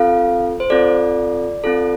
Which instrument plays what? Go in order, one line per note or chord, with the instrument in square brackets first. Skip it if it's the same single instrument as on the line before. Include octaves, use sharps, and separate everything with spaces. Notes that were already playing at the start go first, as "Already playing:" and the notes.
Already playing: [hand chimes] C4 F4 A4 F5
C5
C4 F4 A4 D5
C4 F4 A4